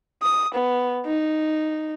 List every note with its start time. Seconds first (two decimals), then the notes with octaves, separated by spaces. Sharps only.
0.22 D#6
0.54 B3
1.05 D#4